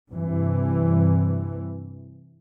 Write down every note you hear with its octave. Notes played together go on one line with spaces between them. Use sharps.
G2 C3 E3